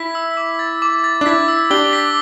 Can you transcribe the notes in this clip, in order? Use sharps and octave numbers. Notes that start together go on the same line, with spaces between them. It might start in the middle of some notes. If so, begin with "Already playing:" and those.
Already playing: E4 B6
E6
D6
A6
D6
A6
D4
E4 B6
E6
D4 G4 G7
B6